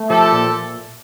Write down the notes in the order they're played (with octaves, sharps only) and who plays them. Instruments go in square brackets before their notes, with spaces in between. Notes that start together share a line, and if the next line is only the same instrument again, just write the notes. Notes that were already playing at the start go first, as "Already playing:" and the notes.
Already playing: [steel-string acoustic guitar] A3
[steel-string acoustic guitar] F3 [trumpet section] G4 A4
[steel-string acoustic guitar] A#2